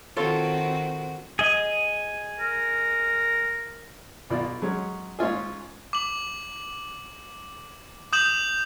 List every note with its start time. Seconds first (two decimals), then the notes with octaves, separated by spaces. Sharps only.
0.17 D#3 C4 F4 F#4 A4 C#5
1.39 G#4 D#5
2.40 A#4
4.30 B1 B2 F4 D5
4.62 F#3 G#3 C#4
5.19 G#2 C#4 F4 G#4
5.93 D6 F#7
8.13 D#6 G6 E7 F#7